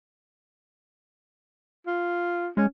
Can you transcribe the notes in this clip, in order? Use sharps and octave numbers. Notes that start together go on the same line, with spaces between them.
F4
G#3 C#4